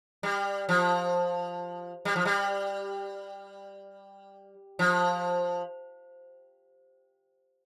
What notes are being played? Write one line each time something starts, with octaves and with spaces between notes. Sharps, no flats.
G3
F3
G3
F3
G3
F3